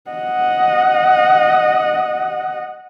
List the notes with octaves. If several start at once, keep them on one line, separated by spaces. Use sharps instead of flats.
D#5 F#5